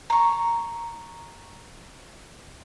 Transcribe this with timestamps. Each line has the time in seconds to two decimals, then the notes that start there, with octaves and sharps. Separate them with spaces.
0.10 A#5 C#6